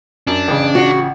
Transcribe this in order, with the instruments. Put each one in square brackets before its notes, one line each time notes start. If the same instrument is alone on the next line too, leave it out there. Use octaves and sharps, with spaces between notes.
[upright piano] F#2 [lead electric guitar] D4
[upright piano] A1 C#3
[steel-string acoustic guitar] F#4